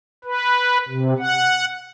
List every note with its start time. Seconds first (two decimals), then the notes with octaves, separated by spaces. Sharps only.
0.24 B4
0.88 C3
1.19 F#5